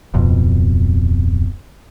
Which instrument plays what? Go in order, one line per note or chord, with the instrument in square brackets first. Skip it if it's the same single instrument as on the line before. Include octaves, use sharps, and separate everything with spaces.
[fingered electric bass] D1 F2 B2